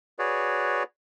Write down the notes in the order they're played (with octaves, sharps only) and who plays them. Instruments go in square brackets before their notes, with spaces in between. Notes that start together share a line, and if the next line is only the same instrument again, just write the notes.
[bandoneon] F#4 G#4 B4 C#5 D5